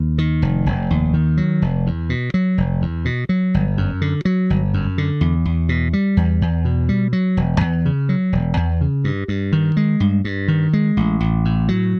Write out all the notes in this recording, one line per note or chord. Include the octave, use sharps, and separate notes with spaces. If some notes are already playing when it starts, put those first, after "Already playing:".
Already playing: D#2
D#3
F1
F1
D#2
D#3
F#3
F1
E2
B2
F#3
F1
E2
B2
F#3
G1
F#2
D3
F#3
G1
F#2
D3
E2
E2
B2
G3
E2
E2
B2
G3
F#3
E1
E2
C#3
F#3
E1
E2
C#3
G2
G2
D#3
G#3
G2
G2
D#3
G#3
A1
A1
A2
F#3